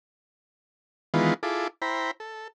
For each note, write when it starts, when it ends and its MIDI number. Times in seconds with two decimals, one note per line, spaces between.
1.14 1.34 51
1.14 1.34 52
1.14 1.34 56
1.14 1.34 59
1.14 1.34 65
1.43 1.68 64
1.43 1.68 65
1.43 1.68 68
1.43 1.68 69
1.43 1.68 86
1.82 2.11 64
1.82 2.11 72
1.82 2.11 79
1.82 2.11 82
1.82 2.11 83
2.20 2.48 69